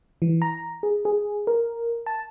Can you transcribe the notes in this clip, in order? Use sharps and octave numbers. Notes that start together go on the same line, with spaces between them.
E3
A#5
G#4
G#4
A#4
A5